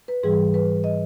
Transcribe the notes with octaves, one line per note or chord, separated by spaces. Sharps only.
B4
G#2 E3 G3 G#4
B4
D#5